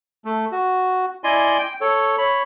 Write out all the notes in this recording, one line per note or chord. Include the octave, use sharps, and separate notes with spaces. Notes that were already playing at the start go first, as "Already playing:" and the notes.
A3
F#4
E4 D5 D#5 G#5 C6
G5
A4 C#5
C#5 B5